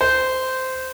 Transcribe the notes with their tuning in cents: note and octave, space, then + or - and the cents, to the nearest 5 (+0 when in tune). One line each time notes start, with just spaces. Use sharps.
C5 -15